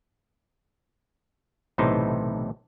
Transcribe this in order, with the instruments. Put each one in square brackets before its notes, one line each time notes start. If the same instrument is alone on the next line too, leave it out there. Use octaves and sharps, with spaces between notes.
[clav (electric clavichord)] B1 A2 C3 E3 D#4 C5